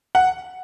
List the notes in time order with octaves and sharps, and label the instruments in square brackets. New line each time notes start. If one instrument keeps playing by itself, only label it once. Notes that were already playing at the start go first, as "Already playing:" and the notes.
[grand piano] F#5